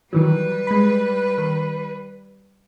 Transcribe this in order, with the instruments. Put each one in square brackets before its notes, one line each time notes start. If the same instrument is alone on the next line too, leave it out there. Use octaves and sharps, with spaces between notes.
[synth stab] D#3 E3 F#3 [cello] G3 B4
[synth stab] G#3 B5
D#3